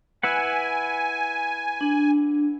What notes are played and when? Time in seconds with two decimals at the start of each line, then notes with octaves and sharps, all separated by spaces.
0.23 E4 B4 F#5 G#5
1.81 D4